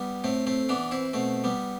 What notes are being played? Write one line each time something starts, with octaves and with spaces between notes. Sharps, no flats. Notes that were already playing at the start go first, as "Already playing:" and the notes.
Already playing: G3 B3
A2 A3 C4
A3 C4
E3 B3 D4
C4 E4
B2 A3 C4
G3 B3